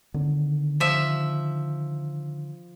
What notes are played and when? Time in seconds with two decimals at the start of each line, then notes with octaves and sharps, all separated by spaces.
0.14 D3 D#3 C4
0.80 F3 E5